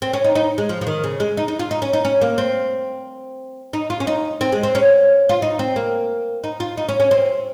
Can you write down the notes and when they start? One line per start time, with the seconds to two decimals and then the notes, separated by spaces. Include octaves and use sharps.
0.02 C4
0.13 C#4
0.24 D#4
0.35 D#4
0.58 G#3
0.69 F3
0.81 F3
0.87 D#3
1.04 C#3
1.20 G#3
1.37 D#4
1.48 D#4
1.59 F4
1.71 D#4
1.82 C#4
1.93 D#4
2.05 C#4
2.21 A#3
2.38 C4
3.73 D#4
3.90 F4
4.00 C#4
4.07 D#4
4.41 C4
4.52 G#3
4.63 C4
4.75 C#4
5.29 F4
5.42 D#4
5.59 C4
5.76 A#3
6.44 D#4
6.60 F4
6.77 D#4
6.89 C#4
7.00 C#4
7.11 C4